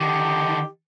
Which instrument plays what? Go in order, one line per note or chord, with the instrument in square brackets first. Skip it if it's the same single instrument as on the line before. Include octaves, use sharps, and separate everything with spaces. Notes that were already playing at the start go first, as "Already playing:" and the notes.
[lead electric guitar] D3 D#3 [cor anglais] G4